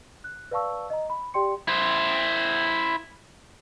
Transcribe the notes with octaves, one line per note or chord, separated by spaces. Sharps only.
F#6
B4 D5 F5 A5 C#6 E6
D#5 A#5
B5
G4 D5 G5 C6 C#7
E4 C5